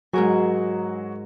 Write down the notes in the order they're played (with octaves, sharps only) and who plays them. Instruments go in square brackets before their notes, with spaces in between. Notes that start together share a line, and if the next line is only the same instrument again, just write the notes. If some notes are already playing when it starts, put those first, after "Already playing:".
[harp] G#2 A#4 G#5 [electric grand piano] F#3 F#4 G#4